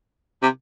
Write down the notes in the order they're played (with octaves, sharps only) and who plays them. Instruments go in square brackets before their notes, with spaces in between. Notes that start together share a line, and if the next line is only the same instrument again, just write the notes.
[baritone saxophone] C3